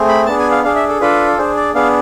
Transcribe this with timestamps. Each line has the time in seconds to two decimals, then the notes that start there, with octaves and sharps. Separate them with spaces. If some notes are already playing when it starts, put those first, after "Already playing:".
Already playing: A3 C4 G#4
0.09 B5
0.26 B3 D4 G#4 A5
0.39 G#5
0.51 F5
0.64 D4 G#4 F5
0.76 E5
0.89 A4
1.01 D4 F4 A4 B4
1.38 D4 G#4 C5
1.57 D5
1.74 B3 D4 G#4 F5